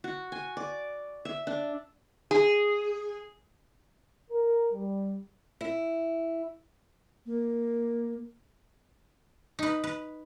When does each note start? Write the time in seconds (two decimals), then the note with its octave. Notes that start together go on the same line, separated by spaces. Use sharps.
0.04 F#4
0.32 G#5
0.57 D5
1.25 E5
1.47 D4
2.31 G#4
4.31 A#4
4.72 G3
5.61 E4
7.26 A#3
9.59 D#4 B4
9.84 B4